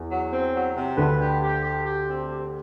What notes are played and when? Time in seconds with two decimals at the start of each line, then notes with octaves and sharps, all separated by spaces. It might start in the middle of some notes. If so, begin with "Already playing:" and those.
Already playing: E2
0.11 F#3
0.32 C4
0.54 F#3
0.75 C3
0.97 D2 D3 B4
1.19 G4
1.42 G4
1.63 G4
1.85 G4
2.08 C4
2.29 G4